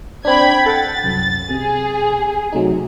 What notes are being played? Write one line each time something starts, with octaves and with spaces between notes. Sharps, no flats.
C4 D4 G5 B5 G#6
A4 F#5 G5 A6
C2 F#2
C3 G#4
C3 F#3 A3 D#4